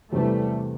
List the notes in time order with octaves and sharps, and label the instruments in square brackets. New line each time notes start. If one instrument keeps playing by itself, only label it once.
[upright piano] E2 C3 E3 [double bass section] G3 A3